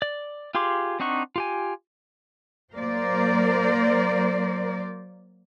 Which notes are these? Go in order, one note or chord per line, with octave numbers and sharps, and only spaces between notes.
D5
F4 G4 G#4 C6 D6
C4 D4 D#4 F#5 C#6
F4 G4 G#5
F#3 A#3 A#4 C5 D5